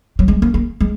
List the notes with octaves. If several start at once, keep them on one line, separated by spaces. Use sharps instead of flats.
F#3
G#3
A#3
A#3
G#3